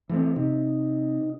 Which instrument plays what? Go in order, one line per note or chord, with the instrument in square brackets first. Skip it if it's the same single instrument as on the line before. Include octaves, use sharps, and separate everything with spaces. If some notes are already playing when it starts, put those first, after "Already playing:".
[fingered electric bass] E3 A3 C4
[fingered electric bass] C3 [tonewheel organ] D#4